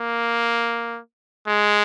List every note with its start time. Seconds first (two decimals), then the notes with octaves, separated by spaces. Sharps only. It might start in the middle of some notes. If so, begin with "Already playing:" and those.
Already playing: A#3
1.48 G#3